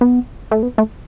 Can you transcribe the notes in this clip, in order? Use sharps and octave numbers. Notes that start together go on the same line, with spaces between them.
B3
A3
B3
A3